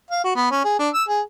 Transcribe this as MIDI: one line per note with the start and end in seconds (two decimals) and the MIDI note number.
0.11 0.23 77
0.24 0.32 66
0.36 0.50 59
0.51 0.64 61
0.64 0.78 68
0.79 0.89 62
0.94 1.03 88
1.09 1.21 68